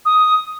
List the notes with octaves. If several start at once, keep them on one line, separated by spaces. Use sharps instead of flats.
D#6